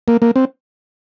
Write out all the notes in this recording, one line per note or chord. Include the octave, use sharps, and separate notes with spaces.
A#3
A#3
C4